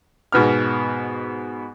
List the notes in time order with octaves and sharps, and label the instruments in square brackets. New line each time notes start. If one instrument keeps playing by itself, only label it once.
[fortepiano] G#2 B2 B3 F6